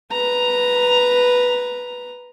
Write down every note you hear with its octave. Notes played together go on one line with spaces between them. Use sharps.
B4 A#5